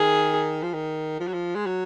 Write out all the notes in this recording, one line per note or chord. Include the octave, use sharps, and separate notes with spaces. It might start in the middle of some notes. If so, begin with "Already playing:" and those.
Already playing: D#3 G#4
F3
D#3
F3
F#3
F3
G#3
F#3